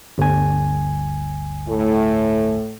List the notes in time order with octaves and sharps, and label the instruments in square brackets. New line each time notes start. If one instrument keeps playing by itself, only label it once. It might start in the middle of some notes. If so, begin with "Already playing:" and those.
[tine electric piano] G1 D2 G#5
[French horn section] A2 A3